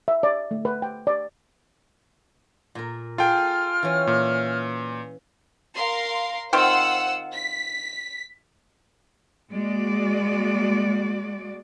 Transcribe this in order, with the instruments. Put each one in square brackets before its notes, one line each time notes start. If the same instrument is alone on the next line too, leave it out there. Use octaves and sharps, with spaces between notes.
[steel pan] E5
D5
A3
B4
G5
D5
[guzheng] A#2 A#4
[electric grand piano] F4 G5 [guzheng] G#4 A4 [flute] F6
[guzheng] E3 C#4
[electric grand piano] A#2
[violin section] A#4 F5 C6
[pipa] D#3 C4 F4 [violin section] C5 F#5 E6
[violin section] B6
[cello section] G#3 A#3 F#4 D5